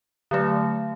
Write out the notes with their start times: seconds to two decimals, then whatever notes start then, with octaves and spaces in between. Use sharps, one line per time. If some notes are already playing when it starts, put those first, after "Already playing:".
0.31 D3 F#3 A3